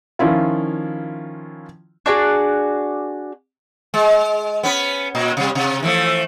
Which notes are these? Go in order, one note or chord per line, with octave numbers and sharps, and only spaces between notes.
D#3 F3 C#4 E4 F4
D4 F#4 G#4 D5
G#3
B3 C#4 B4
A#2
C3 G3
C3
E3 F3 A3